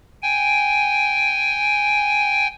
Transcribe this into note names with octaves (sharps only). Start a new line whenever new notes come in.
G5 G#5